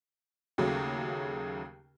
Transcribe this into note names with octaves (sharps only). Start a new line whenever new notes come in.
D#2 C#3 F#3 A3